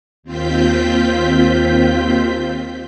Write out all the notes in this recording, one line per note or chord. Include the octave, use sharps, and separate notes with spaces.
D#2 C4 F4 G6 B6